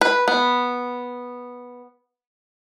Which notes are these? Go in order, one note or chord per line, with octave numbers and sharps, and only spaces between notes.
B4
B3